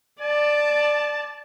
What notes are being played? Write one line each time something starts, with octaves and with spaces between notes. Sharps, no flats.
D5 A5